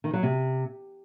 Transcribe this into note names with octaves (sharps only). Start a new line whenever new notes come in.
D#3
F#3
C3